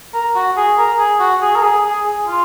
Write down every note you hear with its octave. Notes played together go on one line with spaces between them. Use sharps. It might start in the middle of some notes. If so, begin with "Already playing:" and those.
A#4
F#4
G#4
A#4
G#4
F#4
G#4
A#4
G#4
G#4
G#4
F4